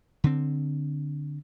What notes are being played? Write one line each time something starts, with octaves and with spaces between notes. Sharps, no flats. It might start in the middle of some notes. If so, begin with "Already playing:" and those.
D3 C4